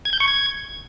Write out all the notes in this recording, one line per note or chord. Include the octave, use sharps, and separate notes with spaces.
G#6
G6
C#6
G#6